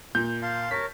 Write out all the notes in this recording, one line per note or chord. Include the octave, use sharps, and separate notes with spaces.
A#2 G6
F5 A5 C6
A#4 C#5 A5 B6